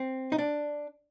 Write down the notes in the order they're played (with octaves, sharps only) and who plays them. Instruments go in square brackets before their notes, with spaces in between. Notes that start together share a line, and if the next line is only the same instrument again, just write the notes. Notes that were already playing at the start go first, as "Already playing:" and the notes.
Already playing: [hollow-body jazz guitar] C4
D#4
D4